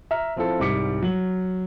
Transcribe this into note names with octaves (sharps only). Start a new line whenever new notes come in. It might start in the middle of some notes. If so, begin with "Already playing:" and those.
E5 A#5 F6
F3 C4 E4 F4 A4
C2 G#2 G3 D6 B6 C#7
F#3 F#7